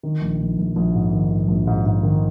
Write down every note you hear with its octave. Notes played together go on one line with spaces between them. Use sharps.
D#3
A#1
A#1
A#1
A#1
G#2
D#3
G#2
A#1
G#2
G#2
D#3